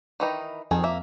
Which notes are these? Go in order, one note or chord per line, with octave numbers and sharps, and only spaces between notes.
D#3 E3 D#4
F2 D#3 G#4 A4
A#3 E5